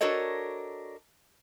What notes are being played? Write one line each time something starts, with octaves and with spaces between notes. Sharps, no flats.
D4 F#4 A4 A#4 C#5 D#5